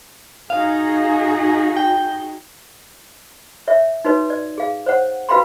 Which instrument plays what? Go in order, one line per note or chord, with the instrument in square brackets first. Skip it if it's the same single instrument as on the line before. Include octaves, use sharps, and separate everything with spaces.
[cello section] D#4 F#4 G#4 [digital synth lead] F5
[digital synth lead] G5
[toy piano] C#5 E5
D#4 F#4 B4 C#5
D5
G#4 F5
C5 C#5 F#5
F#4 B4 F5 G5 B5 C6